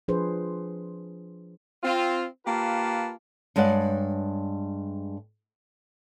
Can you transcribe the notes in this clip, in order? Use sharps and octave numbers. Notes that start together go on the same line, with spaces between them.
F3 D4 G#4 B4 C5
C4 F4
A#3 F4 G4 B4 A5
G2 G#3 C#5 D5 F#5